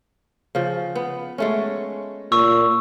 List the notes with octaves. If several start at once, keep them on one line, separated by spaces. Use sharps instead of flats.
C#3 F3
B3
G#3 A3 C#4
A#2 C#6 E6